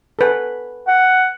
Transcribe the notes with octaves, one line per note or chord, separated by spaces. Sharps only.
A4 B4 G#5
F#5